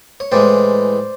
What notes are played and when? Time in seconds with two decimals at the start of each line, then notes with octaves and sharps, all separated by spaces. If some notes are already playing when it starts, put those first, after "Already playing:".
0.20 C#5
0.32 A2 E3 G#3 C5 D5